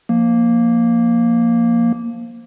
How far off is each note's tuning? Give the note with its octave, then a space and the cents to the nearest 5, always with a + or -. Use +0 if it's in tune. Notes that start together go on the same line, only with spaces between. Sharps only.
F3 +0 A#3 +0